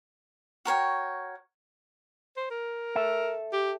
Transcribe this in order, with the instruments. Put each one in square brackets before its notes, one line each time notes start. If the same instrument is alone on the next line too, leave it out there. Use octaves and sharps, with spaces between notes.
[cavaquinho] F#4 A#4 C#5 G5
[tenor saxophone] C5
A#4
[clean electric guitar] A4 E5
[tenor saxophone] G4